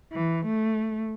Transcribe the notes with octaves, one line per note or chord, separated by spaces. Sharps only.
E3
A3